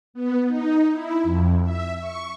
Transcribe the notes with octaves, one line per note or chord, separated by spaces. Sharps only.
B3
D#4
E4
F2
E5
C#6